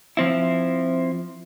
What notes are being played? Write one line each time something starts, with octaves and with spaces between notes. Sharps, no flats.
F3 C4 E4